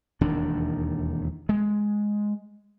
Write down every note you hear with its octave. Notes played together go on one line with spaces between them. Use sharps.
E1 D#2 D#3 D4
G#3